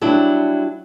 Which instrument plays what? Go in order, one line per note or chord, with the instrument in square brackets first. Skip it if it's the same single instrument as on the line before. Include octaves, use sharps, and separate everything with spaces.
[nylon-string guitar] F#3 G3 D4 E4